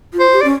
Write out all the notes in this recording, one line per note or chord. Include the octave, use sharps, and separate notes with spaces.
F4
C5
G4
D5
C#4